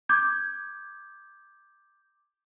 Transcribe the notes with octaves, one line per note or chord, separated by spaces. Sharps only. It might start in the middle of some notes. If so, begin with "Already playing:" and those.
D6 G6 G#6